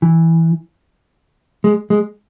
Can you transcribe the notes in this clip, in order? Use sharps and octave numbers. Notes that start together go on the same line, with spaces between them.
E3
G#3
G#3